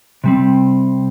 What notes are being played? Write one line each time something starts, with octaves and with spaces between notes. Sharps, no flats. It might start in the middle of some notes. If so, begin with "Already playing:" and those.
C3 G3 C4